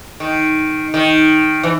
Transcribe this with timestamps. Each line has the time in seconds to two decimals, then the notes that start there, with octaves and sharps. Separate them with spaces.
0.20 D#3
0.94 D#3
1.63 E3